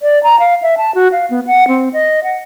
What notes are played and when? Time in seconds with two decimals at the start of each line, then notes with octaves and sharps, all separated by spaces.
0.02 D5
0.23 A#5
0.39 F5
0.62 E5
0.78 A5
0.95 F#4
1.12 F5
1.30 B3
1.47 F#5
1.68 C4
1.93 D#5
2.24 F#5